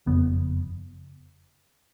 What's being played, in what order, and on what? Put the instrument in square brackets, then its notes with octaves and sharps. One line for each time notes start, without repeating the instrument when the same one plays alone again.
[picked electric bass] F#1 F2 C#3 B3